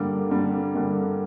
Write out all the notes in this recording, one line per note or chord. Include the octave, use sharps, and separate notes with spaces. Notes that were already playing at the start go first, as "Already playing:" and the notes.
Already playing: G2 D3 G3 A#3
G2 D3 G3 A#3
G2 D3 G3 A#3